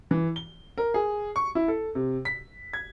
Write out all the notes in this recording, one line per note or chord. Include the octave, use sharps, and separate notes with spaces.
E3
G7
A#4
G#4
C#6
E4
A4
C3
B6
G#6